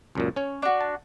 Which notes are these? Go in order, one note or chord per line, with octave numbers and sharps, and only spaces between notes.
C#2 F#2 A#2
C#4 C#5
D4 F#4
A5